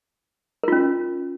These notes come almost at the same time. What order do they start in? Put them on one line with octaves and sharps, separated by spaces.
A#4 F4 C#4